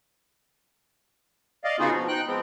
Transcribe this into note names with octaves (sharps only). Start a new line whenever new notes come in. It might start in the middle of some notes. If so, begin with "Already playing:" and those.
D5 D#5 F5
C#3 B3 D#4 F4 F#4 G#4
B2 F3
D#4 G5 F#6
F3 G#3 B3 C4